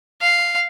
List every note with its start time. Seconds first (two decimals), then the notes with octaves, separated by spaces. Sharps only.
0.22 F5